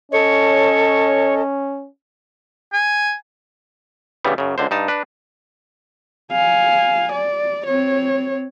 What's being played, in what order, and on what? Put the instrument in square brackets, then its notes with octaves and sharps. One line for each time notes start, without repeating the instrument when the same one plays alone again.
[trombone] C#4 [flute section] A4 D#5 [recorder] C#5
[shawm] G#5
[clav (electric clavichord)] G2 C#3 E3 G3 B3
F#2 C#3
C#2 D3 C5
G2 D#4 A5
D4 B4
[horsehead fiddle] F5 G#5
D5
C4 C#5